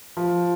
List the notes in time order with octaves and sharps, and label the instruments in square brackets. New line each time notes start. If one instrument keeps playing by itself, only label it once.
[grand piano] F3